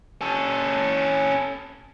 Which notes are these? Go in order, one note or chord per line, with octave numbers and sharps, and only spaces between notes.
C#4 A4